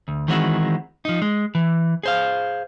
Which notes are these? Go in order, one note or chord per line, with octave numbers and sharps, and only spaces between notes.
D2
D#3 E3 G#3 C4 F#4
F3 D#4
G#3
E3
G#4 C5 F5